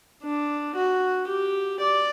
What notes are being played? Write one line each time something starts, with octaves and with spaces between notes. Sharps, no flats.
D4
F#4
G4
D5